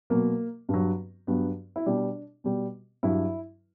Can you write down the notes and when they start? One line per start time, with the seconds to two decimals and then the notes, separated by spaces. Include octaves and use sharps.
0.10 B2 F#3 A#3
0.69 G2 F#3
1.27 G2 F#3 B3
1.76 E4
1.86 B2 G3 D4
2.44 B2 G3
3.03 G2 F#3 E4